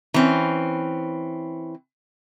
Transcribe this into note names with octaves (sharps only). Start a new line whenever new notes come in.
E3 C4 C#4